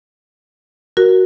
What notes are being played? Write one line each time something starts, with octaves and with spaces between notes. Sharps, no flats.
F#4 A#4